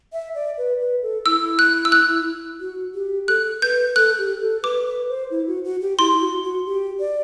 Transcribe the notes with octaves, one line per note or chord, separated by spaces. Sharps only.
E5
D5
B4
B4
A4
E4 E6
F#6
E6
F#6
F#4
G4
A4 F#6
B4 G6
A4 F#6
G4
A4
B4 D6
B4
C5
E4
F#4
F#4
G4
E4 C6
F#4
F#4
G4
D5